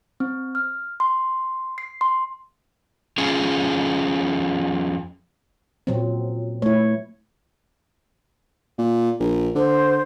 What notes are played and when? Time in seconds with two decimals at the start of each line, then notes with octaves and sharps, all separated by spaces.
0.20 C4
0.55 F6
1.00 C6
1.78 C7
2.01 C6
3.18 F2 C#4 F4 G#4
5.87 A#2 F#3 C4
6.62 A3 E4 C#5
8.78 A#2
9.20 A#1
9.55 D3 C5